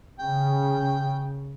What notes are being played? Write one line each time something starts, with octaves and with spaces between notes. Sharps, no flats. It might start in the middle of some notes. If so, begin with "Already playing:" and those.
C#3 G5